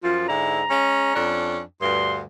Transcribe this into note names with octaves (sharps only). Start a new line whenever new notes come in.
F#2 F3 F4
G#2 D3 E4 A#5
G#3 C#4
F2 C#4 D4
D2 G2 C6